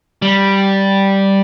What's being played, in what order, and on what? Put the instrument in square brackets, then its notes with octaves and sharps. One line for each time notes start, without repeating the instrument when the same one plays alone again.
[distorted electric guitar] G3